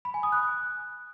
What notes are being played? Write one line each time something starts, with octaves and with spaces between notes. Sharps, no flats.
B5
G#5
D#6
F#6